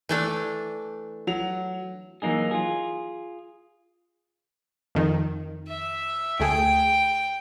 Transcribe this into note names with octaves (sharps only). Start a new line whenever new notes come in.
E3 A3 D4
F#3 F7
E3 F#3 A#3 D#4 G#4
F4 G#4
F2 D#3
E5
D2 A3 G#4 G5